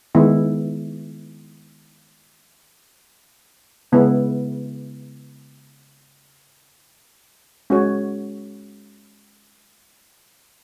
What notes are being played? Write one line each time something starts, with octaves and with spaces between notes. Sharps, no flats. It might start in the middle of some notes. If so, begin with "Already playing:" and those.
D#3 G#3 B3 E4
C#3 G#3 B3 E4 B4
G#3 C#4 F#4 C#5